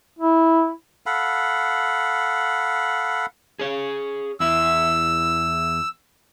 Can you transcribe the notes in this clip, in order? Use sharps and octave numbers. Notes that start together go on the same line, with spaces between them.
E4
A4 F5 F#5 B5
G#4 C#5
E2 E4 E6